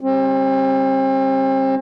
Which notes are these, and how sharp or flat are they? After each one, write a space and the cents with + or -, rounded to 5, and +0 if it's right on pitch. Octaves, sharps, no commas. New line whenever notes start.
G3 +0 C4 +40